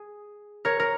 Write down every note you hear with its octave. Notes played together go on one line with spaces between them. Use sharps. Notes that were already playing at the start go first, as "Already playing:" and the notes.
Already playing: G#4
A#4 C#5
A#4